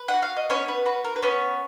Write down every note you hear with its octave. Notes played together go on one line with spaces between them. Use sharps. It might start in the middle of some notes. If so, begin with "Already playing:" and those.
Already playing: B4
F#5
F#4
F5
D#5
B3 C#4 C#5
B4
F#4 B4
A#4
B4
B3 C#4 C#5